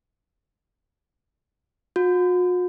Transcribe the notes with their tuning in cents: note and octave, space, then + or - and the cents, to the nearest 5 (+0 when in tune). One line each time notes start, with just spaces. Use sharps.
F#4 -45